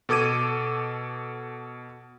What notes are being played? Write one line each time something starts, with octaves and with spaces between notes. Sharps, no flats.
B2 A4 D6 G#6 D#7